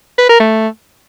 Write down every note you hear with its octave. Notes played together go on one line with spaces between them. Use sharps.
B4
A#4
A3